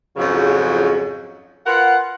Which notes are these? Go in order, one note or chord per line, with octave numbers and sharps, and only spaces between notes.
F2 G#2 C#3 F3 F#3 C#4
F4 A#4 B4 F#5